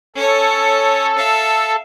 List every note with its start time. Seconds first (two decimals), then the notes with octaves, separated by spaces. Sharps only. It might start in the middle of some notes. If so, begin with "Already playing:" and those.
0.16 C#4 A4 C#5
1.18 E5 F5